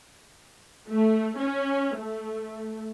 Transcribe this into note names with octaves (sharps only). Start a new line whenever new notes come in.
A3
C#4
A3